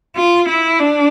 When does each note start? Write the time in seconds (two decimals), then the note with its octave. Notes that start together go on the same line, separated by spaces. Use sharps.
0.17 F4
0.49 E4
0.79 D4